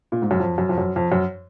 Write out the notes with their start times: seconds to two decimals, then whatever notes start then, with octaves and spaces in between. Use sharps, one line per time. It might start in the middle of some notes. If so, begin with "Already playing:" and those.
0.12 A#2
0.22 G#2
0.31 F#2
0.40 F2
0.58 F#2
0.69 F2
0.78 F#2
0.96 F2
1.12 F#2